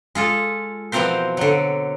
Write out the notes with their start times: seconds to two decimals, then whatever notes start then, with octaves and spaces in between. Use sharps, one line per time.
0.15 G#3 F4 A4
0.92 B2 E3 F3 C4 A#4 C5
1.37 D3 F#3